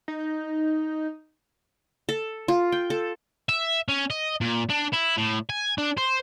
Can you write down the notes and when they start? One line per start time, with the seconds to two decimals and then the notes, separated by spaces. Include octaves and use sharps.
0.08 D#4
2.09 A4
2.48 F4
2.72 G5
2.90 A4
3.49 E5
3.88 C#4
4.10 D#5
4.41 A#2
4.69 D4
4.93 E4
5.18 A2
5.50 G#5
5.78 D4
5.98 C5